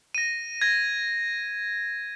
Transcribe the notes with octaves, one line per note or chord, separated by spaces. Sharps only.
A#6 D#7
G#6 A#6